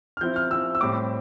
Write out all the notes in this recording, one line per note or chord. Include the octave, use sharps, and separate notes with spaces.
F6
F3 C4 E4 G6
F6
F3 C4 E4 E6
E6
A2 G3 C4 D6